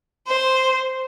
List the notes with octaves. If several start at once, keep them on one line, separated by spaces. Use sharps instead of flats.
C5